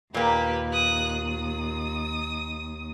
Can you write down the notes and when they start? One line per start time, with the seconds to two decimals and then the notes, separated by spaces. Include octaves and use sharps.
0.14 D#2 A#2 A#3 G4 B4
0.72 D#6 F#6
1.12 D#6